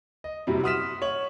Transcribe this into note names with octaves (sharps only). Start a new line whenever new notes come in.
D#5
F#2 C3 F#3 G3 E4
F#5 C6 D#6 F6 B6 E7
C#5 F#7